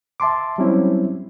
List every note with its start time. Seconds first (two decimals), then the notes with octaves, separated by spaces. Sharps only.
0.20 E5 A5 C6 D6
0.58 F#3 G3 C4 C#4 E4